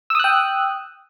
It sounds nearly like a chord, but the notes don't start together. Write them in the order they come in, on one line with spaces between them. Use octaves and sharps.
E6 D#6 F#6 G5